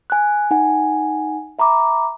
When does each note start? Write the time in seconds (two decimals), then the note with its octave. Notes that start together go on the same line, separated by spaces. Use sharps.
0.10 G#5 F#6
0.51 D#4 F#5 G#5
1.59 E5 A#5 B5 D6